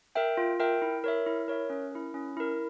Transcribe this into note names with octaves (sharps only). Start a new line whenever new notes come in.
A#4 E5 G5
F4
A#4 E5 G5
E4
A#4 C#5 E5
E4
A#4 C#5 E5
C#4
E4 A#4
C#4
E4 A#4